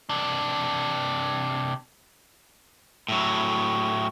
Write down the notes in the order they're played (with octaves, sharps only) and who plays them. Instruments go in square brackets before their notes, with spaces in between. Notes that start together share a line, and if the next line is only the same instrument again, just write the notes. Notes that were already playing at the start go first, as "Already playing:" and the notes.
[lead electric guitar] C3 D4
[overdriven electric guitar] A2 F#3